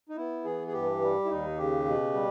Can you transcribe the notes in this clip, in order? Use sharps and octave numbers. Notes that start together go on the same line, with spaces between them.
D#4
B3 E4
E3 G#4
G#4
G2 G4
G3
E4
D#2 D#4
C#3 G4
B2
G3